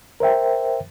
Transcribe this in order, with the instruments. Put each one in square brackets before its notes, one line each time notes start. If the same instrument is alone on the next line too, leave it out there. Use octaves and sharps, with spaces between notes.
[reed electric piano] A#4 C5 E5 G5